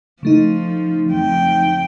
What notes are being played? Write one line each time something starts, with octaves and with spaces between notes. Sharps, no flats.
C#3 F3 A3 D#4
F2 G5